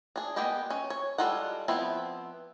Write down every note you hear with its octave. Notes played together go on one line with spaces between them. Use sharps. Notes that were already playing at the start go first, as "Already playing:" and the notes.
D4 G#4
G#3 A#3 B3 G4 D#5
C#4
C#5
G3 G#3 F4 A4 F#5
F3 B3 C4 E4